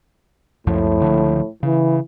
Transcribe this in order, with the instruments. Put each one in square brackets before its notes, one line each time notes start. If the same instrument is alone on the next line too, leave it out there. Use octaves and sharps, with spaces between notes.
[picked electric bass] C#2 F#2 F3 [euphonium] A2
[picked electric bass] C#2 D3 F3
[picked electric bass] C#3 [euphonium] E3